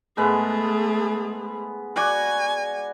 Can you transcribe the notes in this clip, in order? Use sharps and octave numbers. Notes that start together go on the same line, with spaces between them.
G#2 G#3 A3 B3 G#4
F#4 D5 F#5 G#5